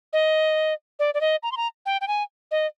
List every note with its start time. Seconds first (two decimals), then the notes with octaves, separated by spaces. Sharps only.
0.13 D#5
0.99 D5
1.14 D5
1.21 D#5
1.43 A#5
1.52 C6
1.57 A#5
1.86 G5
2.01 G5
2.08 G#5
2.51 D#5